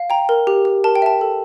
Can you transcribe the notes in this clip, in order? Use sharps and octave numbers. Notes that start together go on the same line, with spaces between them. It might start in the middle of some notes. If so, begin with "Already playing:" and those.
Already playing: F5
G5 A#5
A#4
G4
G4
A#4 A5
G5
E5 A5
A4